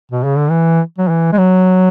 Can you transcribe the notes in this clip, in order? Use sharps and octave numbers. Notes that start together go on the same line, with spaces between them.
B2
C#3
D3
E3
F#3
E3
G#3
F#3